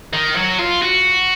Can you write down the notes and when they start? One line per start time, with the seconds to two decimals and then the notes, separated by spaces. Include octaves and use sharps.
0.13 D#3
0.36 F#3
0.59 F4
0.82 F#4